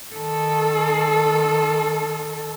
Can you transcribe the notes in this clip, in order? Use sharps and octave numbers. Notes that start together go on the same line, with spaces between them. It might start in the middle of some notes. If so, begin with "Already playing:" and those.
D#3 A4